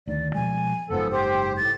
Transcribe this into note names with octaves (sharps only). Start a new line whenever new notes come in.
D2 D#3 D5
B2 F3 G#3 G#5
F#1 G#2 F3 B3 A4
G4 C5 G5
A2 A6